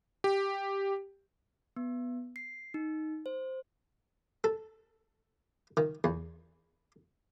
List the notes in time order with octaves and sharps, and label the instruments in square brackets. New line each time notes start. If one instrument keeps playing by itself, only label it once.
[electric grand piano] G4
[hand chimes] B3
C7
D#4
C5
[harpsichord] A4
D#3
E2